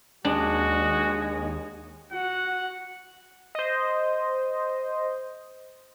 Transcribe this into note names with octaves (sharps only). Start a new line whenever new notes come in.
D#2 G#3 D4 F#4
F#4 F#5
C5 D#5